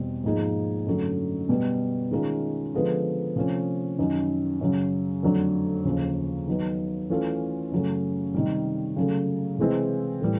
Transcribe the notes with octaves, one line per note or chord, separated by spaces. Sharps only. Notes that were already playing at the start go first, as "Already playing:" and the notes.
Already playing: E2 B2 G3 C4
G#2 F3 A#3 D#4 G#4
F#2 D3 F#3 A3
B2 G3 B3
D#3 G#3 C#4 F4 A#4
D3 F3 G#3 B3
C3 F3 A3 C#4
F#2 D#3 F#3
F#2 C#3 F#3
F2 D3 F#3 A3 D4
D#2 C#3 F3
D#3 F#3 B3
E3 A3 C#4 F4 A4
F#2 C#3 F#3 A3 C#4
C3 D#3 G3
C#3 F#3 A3
C3 E3 G#3 C4 E4
A2 E3 G3